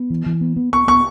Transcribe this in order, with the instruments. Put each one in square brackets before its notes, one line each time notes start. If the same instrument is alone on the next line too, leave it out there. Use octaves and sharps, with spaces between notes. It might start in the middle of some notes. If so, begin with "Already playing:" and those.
Already playing: [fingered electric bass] B3
E3
E3
B3
B3
[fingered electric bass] B3 [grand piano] C#6
[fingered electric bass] B3 [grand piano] C#6